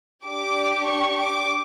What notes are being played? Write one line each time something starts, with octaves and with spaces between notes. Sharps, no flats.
D4 G4 D6
C#6
D6